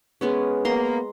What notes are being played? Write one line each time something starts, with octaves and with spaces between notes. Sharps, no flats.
G#3 B3 C#4
A#3 B3 A#5 C6